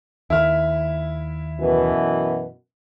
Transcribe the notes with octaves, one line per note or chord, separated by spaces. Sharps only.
D#2 E4 F6
F#2 B2 E3